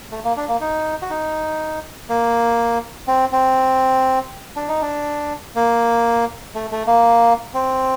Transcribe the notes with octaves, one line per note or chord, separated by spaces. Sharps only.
A3
A#3
D4
A#3
D#4
F#4
D#4
A#3
C4
C4
D4
D#4
D4
A#3
A3
A3
A#3
C4